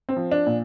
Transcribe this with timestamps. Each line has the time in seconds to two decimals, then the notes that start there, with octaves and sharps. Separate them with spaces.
0.09 C4
0.17 F3
0.32 D4
0.47 A#2